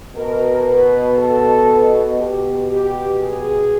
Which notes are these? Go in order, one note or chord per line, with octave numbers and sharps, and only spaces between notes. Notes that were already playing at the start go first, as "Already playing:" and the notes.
B2 A#4
B4
A4
B2 G4
G4
G#4